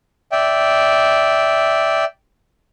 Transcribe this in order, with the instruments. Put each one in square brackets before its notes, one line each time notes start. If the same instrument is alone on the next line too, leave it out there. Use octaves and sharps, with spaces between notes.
[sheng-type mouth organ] D5 E5 G5